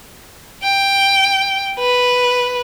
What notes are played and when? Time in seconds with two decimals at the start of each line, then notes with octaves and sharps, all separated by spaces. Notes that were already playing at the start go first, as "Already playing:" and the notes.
0.63 G5
1.79 B4